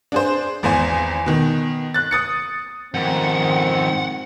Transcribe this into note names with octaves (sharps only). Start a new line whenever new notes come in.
D4 G#4 C5
G#1 E2 C5 G#5
B2 D#3
F#6 A6
D#6 A6 C#7
F2 G#2 D#3 C4 F#5